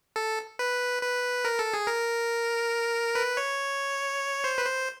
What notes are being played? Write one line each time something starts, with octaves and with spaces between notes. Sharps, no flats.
A4
B4
B4
A#4
A4
G#4
A#4
B4
C#5
C5
B4
C5